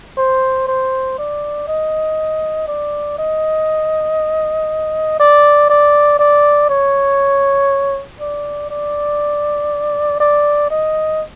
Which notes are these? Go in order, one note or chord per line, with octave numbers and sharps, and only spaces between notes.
C5
C5
D5
D#5
D5
D#5
D5
D5
D5
C#5
D5
D5
D5
D#5